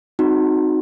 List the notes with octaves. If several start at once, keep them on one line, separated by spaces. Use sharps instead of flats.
C4 D#4 F#4